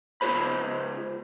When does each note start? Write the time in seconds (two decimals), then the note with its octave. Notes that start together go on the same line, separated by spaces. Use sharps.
0.21 C#2 F4 G#4 C5 B5